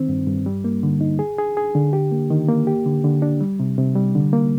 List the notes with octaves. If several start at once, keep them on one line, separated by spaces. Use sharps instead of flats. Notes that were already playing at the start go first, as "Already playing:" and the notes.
Already playing: D#3 C4
G2
G2
G3
A#3
D3
D#4
G#4
G#4
G#4
D3
G4
A#3
D#3
A#3
G4
D3
D3
D4
G3
C3
C3
G3
D3
A#3